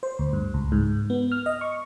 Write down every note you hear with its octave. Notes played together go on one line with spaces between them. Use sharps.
C5
D2
G2
C#2
G#2
B3
F6
D#5
C#6